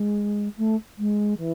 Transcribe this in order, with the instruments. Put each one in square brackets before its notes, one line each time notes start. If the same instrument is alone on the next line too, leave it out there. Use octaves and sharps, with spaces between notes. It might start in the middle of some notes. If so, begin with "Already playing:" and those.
Already playing: [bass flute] G#3
A3
G#3
E3